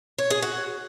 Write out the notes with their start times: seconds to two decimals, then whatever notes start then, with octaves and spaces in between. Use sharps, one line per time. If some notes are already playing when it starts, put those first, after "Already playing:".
0.18 C#5
0.30 G#4
0.42 F#4